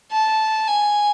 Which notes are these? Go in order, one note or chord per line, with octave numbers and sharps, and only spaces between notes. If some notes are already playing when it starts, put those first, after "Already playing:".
A5
G#5